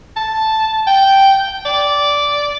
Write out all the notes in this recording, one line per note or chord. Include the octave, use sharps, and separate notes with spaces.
A5
G5
D5